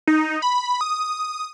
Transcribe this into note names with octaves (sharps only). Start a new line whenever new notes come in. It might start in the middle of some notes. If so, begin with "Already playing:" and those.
D#4
B5
D#6